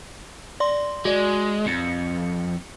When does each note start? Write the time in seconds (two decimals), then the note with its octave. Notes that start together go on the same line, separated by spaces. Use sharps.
0.60 D5 C6
1.05 G#3 F#4 D5
1.67 F2 C#7